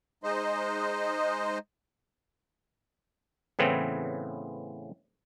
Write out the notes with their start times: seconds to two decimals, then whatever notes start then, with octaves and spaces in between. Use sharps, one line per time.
0.24 G#3 D#4 C5 D#5
3.59 A2 C#3 E3 B3 C4